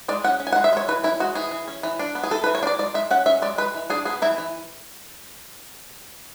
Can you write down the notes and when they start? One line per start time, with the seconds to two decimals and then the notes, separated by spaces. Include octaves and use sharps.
0.08 G#3 D5
0.24 C#4 F#5
0.40 C#4
0.47 G#5
0.53 F#5
0.56 G#3
0.64 E5
0.73 G#3 C#5
0.88 E3 B4
1.04 C#4 E4
1.20 G#3 F#4
1.35 E3 G#4
1.51 E3
1.68 C#4
1.83 E3
1.99 D4
2.15 B3
2.24 G#4
2.31 E3 A4
2.44 B4
2.46 E3
2.55 C#5
2.63 D4
2.67 D5
2.79 G#3 D5
2.94 G#3 E5
3.11 C#4 F#5
3.26 C#4 E5
3.42 G#3 D5
3.58 G#3 B4
3.74 E3
3.90 D4 G#4
4.05 B3 G#4
4.22 E3 E4
4.38 E3